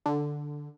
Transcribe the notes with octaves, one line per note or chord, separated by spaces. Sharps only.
D3